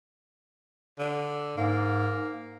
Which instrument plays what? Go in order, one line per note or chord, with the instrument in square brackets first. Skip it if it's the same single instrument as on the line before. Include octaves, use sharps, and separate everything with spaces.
[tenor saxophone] D3
[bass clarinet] G#2 [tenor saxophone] A#3